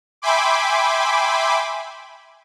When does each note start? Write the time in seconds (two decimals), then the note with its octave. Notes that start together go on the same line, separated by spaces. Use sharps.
0.22 E5 G5 G#5 B5 C6 D6